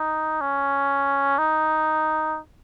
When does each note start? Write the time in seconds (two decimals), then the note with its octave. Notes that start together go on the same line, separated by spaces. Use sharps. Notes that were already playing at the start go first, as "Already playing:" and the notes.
Already playing: D#4
0.41 C#4
1.38 D#4